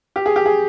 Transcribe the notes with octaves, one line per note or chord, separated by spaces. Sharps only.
G4
G#4
G4
G#4